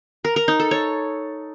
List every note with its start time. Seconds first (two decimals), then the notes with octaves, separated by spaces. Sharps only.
0.25 A#4
0.36 A#4
0.48 D#4
0.60 A4
0.71 C#5